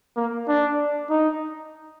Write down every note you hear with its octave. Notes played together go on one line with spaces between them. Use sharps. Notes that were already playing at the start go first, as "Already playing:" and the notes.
A#3
D4
D#4